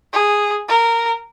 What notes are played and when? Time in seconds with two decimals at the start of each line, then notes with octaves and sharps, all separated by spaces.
0.13 G#4
0.69 A#4